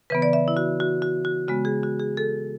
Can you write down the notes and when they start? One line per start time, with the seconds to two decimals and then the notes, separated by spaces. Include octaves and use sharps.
0.10 C#3 E3 B3 B4
0.22 D5
0.33 E5
0.48 E4
0.57 F#4
0.80 F#4
1.02 F#4
1.25 F#4
1.48 C#3 G#3 B3 F#4
1.65 G#4
1.83 F#4
2.00 G#4
2.17 A4